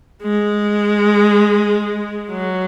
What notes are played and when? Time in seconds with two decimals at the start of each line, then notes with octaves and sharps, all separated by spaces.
0.22 G#3
2.31 F#3